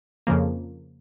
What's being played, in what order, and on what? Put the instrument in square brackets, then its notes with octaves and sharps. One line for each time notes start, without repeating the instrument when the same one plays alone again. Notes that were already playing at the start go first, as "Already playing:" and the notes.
[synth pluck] F2 C#3 F3 A#3